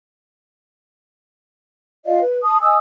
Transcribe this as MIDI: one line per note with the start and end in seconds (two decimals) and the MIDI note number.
2.06 2.20 65
2.06 2.20 74
2.06 2.20 75
2.06 2.20 77
2.21 2.39 71
2.43 2.57 81
2.43 2.57 87
2.61 2.78 75
2.61 2.78 80
2.61 2.78 87
2.61 2.78 88